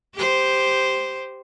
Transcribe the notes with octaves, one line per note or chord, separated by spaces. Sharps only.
G4 C5